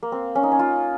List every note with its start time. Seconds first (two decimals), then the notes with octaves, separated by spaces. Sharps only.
0.03 A#3
0.12 C4
0.35 C#4
0.43 D#4
0.52 C#4
0.59 F4